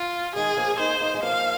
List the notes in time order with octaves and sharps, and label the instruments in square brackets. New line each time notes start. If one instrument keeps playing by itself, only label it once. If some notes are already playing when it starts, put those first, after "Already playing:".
Already playing: [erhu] F4
[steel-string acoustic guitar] D#3 G#3 [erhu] G#4
[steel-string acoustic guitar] F3 A#3
[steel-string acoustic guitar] A#3 D#4 [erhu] C5
[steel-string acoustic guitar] A#3 D#4
G#3
[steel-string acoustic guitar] F3 A#3 [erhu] F5